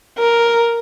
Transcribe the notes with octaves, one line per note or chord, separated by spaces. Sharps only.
A#4